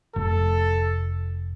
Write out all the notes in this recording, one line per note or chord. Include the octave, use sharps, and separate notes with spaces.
F1 A4